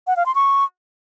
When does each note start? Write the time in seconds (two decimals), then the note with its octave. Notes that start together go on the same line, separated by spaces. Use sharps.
0.07 F#5
0.16 F5
0.26 C6
0.35 C#6